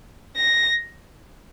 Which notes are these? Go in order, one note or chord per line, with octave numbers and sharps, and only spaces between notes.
A#6